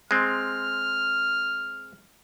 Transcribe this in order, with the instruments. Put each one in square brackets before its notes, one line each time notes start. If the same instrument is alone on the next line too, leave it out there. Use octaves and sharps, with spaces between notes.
[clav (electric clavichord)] G#3 C4 [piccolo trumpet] F6